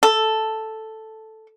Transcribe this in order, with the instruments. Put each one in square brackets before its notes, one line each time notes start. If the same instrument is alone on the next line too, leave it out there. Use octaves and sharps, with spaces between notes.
[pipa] A4